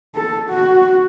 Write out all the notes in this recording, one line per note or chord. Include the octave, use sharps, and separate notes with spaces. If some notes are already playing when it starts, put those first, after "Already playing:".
A4
F#4